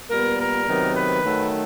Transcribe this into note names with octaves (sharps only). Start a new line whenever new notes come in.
A#2 G3 B3 A#4
A#4
C3 D#3 F#3 B3
B4
D#3 F#3 A3